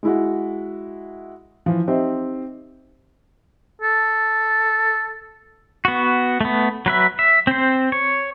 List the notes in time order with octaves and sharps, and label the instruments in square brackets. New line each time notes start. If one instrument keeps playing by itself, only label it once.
[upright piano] G#3 E4 F#4
E3 F3
C4 D#4 G4 C5 E5
[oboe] A4
[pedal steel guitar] B3 F#4
A3 B3
F#3 B4 E5
E5
C4 C5
C#5